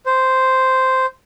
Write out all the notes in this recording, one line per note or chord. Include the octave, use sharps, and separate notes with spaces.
C5